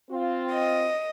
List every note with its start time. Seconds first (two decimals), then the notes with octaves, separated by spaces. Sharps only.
0.10 C4 F4
0.53 D#5